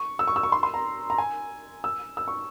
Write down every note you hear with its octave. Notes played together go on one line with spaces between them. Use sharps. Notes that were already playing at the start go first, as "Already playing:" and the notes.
Already playing: C#6
E6
C#6
E6
C#6
C6
C6
A#5
A#5
G#5
E6
E6
C#6